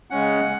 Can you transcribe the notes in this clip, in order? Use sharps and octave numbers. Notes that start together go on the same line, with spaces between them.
C#3 G#3 C#4 F#5